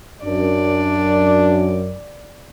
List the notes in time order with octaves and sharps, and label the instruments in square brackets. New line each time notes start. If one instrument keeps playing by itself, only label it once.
[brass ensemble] F#2 [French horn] D4 [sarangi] D5